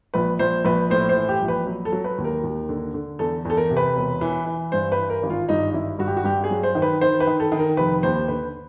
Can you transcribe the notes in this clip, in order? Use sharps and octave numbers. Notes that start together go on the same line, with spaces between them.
A#1 B4
A#1 C5
A#1 B4
A2 C5
C5
E3
G4
A#1
B4
F#3
A4
F#3
B4
D#2
A#4
D#2
D3
D3
E2 A4
E2 A4
A#4
C3
B4
E1
E3
E3
G2 C5
B4
E3
A#4
G#1
F4
G2 D#4
G#1 E4
G2 F#4
G4
F#4
G2 G4
G#4
F#3
C5
D#3
B4
D#3 C5
B4
D#3
A4
D#3
A#4
F1 B4
D#2 C5
D3 B4